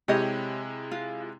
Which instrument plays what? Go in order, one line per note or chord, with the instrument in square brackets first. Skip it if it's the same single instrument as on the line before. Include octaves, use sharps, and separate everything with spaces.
[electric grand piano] C3 G#3 E4 [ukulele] G4 C#5 D#5
[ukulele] F4